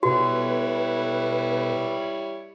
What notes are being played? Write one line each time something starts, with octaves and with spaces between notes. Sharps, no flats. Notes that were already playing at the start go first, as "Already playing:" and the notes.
B2 G3 E4 F#4 A4 B4 C#5